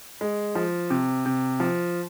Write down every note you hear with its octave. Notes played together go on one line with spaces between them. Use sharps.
G#3
F3
C3
C3
F3